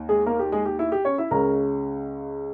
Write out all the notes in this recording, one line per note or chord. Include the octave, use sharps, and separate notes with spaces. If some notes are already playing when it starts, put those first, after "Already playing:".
Already playing: D#2 D#3
G#3 G#4
A#3 A#4
G4
G#3 G#4
G4
E4
G4
C#4 C#5
E4 E5
C#2 C#3 G#3 C#4 A#4 A#5